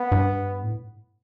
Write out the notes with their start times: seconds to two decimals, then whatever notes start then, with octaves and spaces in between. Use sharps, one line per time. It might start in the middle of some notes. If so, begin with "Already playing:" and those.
Already playing: B3
0.12 G2
0.63 A2